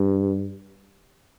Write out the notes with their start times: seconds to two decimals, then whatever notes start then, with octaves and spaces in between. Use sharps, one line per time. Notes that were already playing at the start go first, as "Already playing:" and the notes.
Already playing: G2